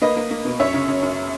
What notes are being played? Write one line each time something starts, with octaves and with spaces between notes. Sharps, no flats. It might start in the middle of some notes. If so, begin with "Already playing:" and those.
A#3 B4 D#5
A#3
A#3
B2
F#2 C#5 E5
C#3
F#2
F#2